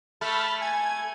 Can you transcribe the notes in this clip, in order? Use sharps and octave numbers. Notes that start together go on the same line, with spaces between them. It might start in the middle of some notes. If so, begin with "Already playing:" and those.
A3 A5 B5 F6
G#5 G#6